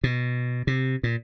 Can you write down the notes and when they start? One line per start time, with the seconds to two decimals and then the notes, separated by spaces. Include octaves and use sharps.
0.04 B2
0.67 C3
1.03 A#2